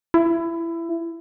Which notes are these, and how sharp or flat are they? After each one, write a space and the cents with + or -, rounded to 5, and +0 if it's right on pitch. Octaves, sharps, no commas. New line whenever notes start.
E4 +20